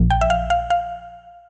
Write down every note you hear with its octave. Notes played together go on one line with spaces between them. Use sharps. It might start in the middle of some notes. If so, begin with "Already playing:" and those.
Already playing: A#1 A#2 F3
G5
E5
F5
F5
F5